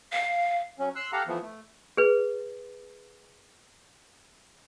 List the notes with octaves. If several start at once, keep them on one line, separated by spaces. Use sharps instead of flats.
F5
F#3 C#4
C6 E6 F#6
G4 A4 F5 F#5 A#5
E3 F3 A3 B3
A3
G#4 B4